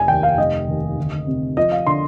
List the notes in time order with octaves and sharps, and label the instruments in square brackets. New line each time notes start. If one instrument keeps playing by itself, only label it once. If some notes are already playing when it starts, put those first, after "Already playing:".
Already playing: [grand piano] F1 G#5
D#2 G5
F5
F1 D#5
D#2
D2
C3
F3 D#5
F5
D3 C6